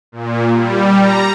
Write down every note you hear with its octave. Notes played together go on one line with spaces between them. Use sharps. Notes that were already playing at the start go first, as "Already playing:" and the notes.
A#2
G3
A#5